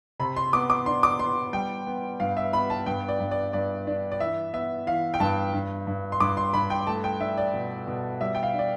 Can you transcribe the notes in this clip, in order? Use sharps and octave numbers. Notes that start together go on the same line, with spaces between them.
C3 B5
C6
B3 D6
D6
D4 C6
D6
B3 C6
G3 G5
B3
G2 F5
E5
B3 B5
A5
G2 G5
D5
G2
D5
G2 D5
D4
D5
E3 E5
B3 E5
E3 F5
G5
G2 A5
G2
G2
C6
G2 D6
C6
G2 B5
G5
A3 A5
G5
D4 E5
D5
B2
B2
G3 E5
G5
F5
D4 D5